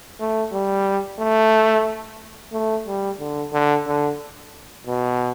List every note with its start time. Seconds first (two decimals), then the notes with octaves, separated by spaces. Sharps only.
0.20 A3
0.53 G3
1.19 A3
2.53 A3
2.87 G3
3.20 D3
3.53 D3
3.87 D3
4.87 B2